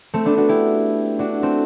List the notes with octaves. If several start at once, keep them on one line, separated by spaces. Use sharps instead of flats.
A3 C4
B3 D4
D4 F#4
E4 G4
D4 F#4
A3 C4